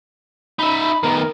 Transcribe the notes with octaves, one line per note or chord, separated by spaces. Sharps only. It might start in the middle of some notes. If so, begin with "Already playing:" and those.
D#4 E5 B5
D#3 B3 A#4